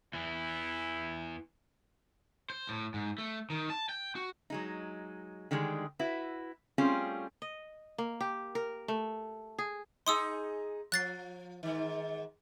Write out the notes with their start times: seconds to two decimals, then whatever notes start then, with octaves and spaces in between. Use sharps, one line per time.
0.14 E2 E3 E4
2.50 C5
2.69 A2
2.94 G#2
3.18 A3
3.50 D#3
3.70 A5
3.89 G5
4.16 F#4
4.50 F#3 G#3 D#4
5.51 D3 D#3 G3 G#3 G#4
5.99 E4 F#4 B4
6.78 G3 A3 C4 C#4 F4 G#4
7.42 D#5
7.98 A#3
8.21 G4
8.55 A#4
8.88 A3
9.58 G#4
10.07 D#4 G#4 C6 D#6 E6
10.92 F3 F#6 A6 C7
11.63 G#2 D#3